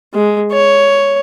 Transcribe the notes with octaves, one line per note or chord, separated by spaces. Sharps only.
G#3
C#5